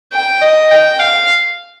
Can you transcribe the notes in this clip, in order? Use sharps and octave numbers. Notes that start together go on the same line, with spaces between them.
G5
D#5
G5
F5